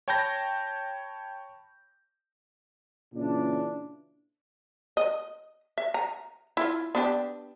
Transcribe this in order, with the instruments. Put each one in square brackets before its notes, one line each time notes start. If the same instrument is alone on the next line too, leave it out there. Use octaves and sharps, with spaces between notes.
[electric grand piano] C#5 G5 A5 B5 G6 A#6
[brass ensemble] A#2 C#3 E3 D4
[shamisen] D#5
E5
A#5
E4 F4
B3 D4 G4